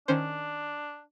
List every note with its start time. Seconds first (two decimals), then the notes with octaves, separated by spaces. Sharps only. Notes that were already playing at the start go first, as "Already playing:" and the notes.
0.08 D#3 C#4 D4 C5